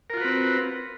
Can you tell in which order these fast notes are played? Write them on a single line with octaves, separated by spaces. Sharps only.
A#4 F4 F#4 B4 C4